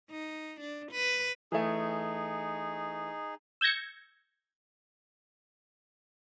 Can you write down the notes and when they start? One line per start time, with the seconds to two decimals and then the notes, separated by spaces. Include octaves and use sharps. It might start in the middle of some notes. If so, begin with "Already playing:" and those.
0.10 D#4
0.60 D4
0.92 B4
1.52 E3 A3 D#4 G#4
3.61 E6 G6 G#6 A#6 C#7